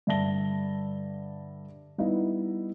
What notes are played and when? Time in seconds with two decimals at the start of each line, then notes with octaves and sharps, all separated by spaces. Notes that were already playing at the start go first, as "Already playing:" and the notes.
0.07 G2 D3 E5 A5 A#6 G7
1.98 G3 B3 D#4 E4